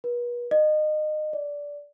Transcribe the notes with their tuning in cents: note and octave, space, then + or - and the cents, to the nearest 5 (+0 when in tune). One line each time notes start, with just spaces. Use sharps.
B4 -40
D#5 -25
D5 -15